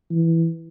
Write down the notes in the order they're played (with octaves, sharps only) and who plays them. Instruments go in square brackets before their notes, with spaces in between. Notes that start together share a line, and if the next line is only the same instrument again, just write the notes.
[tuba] E3